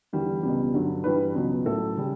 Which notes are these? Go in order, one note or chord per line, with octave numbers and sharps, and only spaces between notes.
E2 D3 G3
C#2 B2 G3
G2 D3 F#3
G2 E3 G3 B4
C#2 B2 F#3
A2 F#3 A4
C#3 G3